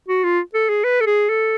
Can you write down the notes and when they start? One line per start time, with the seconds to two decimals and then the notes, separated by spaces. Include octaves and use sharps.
0.08 F#4
0.24 F4
0.54 A4
0.69 G#4
0.84 B4
1.01 A4
1.07 G#4
1.29 A4